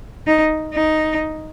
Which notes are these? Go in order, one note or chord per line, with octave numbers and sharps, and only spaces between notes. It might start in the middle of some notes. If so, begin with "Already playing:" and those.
D#4
D#4